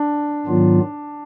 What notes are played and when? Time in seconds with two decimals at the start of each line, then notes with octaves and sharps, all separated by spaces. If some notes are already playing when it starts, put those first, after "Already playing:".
Already playing: D4
0.47 G#2 D#3 F#3 B3 F4